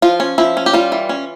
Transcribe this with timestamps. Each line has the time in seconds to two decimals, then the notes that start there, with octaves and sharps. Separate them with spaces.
0.02 F3 F4
0.20 C#4
0.38 F3 E4
0.57 C#4
0.66 G4
0.73 G3 F4
0.92 E3
1.09 C#4